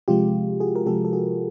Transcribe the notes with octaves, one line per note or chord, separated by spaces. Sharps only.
C3 F3 G#3 F4 G4
F#4 G#4
A#4
C3 F3 G#3 G4 A4
A4
F#4 G#4